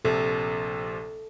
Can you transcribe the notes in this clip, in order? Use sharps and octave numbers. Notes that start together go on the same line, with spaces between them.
A#1 C3 A4